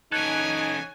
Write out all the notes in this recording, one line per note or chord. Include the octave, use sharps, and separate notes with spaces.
C#4 D#4 A4 C#5 G#5 F#6 G#6